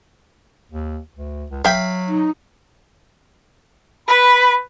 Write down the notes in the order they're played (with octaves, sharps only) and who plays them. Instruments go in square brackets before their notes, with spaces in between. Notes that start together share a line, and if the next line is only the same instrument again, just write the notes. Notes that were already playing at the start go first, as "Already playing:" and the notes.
[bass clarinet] D#2
D2
C#2
[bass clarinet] F#3 [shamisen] E5 G5 [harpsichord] F5 B5
[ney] D#4
[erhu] B4 [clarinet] B5